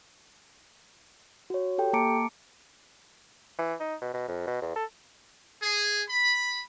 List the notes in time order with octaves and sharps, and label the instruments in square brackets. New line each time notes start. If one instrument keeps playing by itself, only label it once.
[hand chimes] F#4 C#5
G4 A4 G5
A#3 A5 A#5 D6 C#7 D7
[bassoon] E3
D#4
B2
B2
F2
B2
E2
A4
[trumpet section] G#4
B5